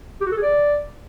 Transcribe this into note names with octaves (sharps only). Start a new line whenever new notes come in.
G4
F#4
A4
G#4
D5